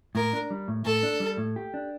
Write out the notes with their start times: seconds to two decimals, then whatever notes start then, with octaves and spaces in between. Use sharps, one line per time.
0.15 A2 A#4
0.33 D4
0.50 G3
0.68 A2
0.85 A2 A4
1.03 D4
1.20 G3
1.37 A2
1.56 G4
1.74 D4